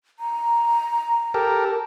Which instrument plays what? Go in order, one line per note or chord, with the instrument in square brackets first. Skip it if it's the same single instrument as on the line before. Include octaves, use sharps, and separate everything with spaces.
[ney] A#5
[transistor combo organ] G4 A4 A#4